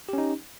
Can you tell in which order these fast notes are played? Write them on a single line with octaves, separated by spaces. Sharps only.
G4 C#4 D#4